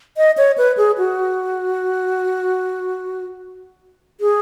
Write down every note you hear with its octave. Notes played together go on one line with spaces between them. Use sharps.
D#5
C#5
B4
G#4
F#4
G#4